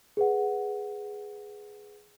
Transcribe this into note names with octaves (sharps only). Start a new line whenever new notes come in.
G#4 B4 F#5